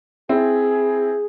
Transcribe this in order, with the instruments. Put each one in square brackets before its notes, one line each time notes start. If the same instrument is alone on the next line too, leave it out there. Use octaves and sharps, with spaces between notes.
[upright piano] C4 E4 [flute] G#4